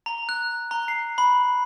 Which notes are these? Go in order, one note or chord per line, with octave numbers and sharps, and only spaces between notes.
A#5
F#6
A#5
C7
B5